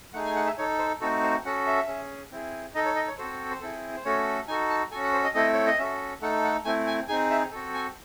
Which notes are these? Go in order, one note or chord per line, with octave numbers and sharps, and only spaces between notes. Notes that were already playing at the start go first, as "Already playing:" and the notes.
A3 D#4 G#4 F#5
G#5
F#5
E5
D#4 A4 C#5
C5
A3 C4 D#4 F#4 A4
C5
C#4 F#4 A4 F#5
E5
C#4 G#4
C4 E4 G#4
D#4 A4 D#5
C#5
D#5
C#5
C4 F#4 A4 C5
C5
C4 E4 G#4 A4
C5
A3 C#4 F#4 A4 C#5
D#4 F#4 A4 G#5
A5
C#4 F#4 A4 G#5
F#5
C5
D#5
A3 C4 E4 A4 D#5
C#5
D#5
C#4 F#4 A4 E5
A3 D#4 A4 F#5
F#5
A3 C4 E4 G#5
G#5
C4 D#4 G#4 G#5
E5
C4 F#4 A4
G#5